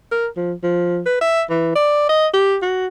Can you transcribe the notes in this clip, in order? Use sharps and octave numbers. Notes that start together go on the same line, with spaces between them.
A#4
F3
F3
B4
E5
E3
D5
D#5
G4
F#4